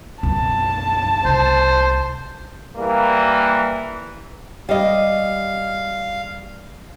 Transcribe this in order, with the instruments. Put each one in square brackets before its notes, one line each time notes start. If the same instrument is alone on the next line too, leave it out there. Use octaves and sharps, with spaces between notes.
[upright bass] B1 F#2 [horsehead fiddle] A5
[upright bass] C2 [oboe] C5
[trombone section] E3 G3 A#3
[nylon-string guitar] G3 D#5 [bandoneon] F5